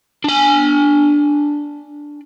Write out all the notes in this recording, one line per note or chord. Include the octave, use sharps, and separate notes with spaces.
D4 G#5